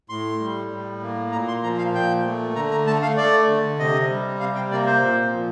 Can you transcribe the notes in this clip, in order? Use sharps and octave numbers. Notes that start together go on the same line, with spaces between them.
A2 C6
G3
A2
A#3
A#2 A#5
C6
F3 A#5
F5
A#2 G5
A3
D3 A#5
A#5
A3 A5
F5
A3 D5
D3
C3 D#5
G3
C3 F5
G5
A#3 D5
C5
A#2
F3